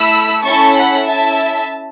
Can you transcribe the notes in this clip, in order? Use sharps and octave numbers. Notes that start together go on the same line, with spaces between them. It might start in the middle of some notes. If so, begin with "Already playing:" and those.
Already playing: A3 E4 A4 B5 E6
C#4 E4 A4 A5 C#6
F#5 B5
C#4 E4 A4 E5 A5